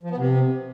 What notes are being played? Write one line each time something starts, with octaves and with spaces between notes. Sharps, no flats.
F3
B3
C3